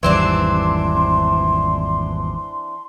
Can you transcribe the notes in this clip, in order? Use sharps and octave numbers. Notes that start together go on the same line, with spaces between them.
G#1 E2 E3 G3 C4 D4 C6